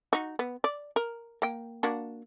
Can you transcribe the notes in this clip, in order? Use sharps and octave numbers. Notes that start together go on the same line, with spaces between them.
D#4 F#4
B3
D5
A#4
A#3 G5
A#3 D4 F#4